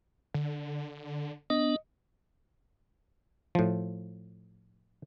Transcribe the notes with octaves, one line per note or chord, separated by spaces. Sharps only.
D3
B3 D4 D#5
A2 F3